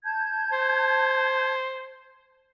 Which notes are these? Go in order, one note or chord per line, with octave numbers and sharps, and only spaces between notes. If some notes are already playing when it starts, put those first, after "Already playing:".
A5 G6 G#6
C5